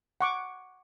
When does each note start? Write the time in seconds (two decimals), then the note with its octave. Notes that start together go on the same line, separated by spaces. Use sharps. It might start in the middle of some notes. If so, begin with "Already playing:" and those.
0.21 F#5 C#6 D6